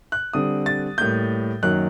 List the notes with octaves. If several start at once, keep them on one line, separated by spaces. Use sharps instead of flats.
F#6
D3 G3 C4 D#6
A6
A2 G3 A#3 G6
F#2 D#3 F#3 A#3 F#6